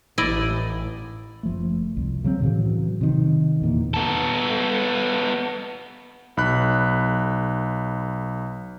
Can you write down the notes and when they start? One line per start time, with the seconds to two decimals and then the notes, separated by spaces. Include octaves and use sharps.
0.18 A1 E4 D5 D#5
1.43 F#1 F3 A3
1.97 C2
2.24 C#3 F#3 G3 C4
2.42 A2 C#3 E3 F#3
3.01 C3 D#3
3.61 E2 A#2 E3
3.94 B3 A4
6.37 B1 B5 F#6